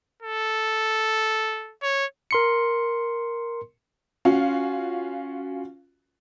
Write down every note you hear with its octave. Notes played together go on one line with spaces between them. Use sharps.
A4
C#5
A#4 C6 C#7
C#4 F4 F#4 F5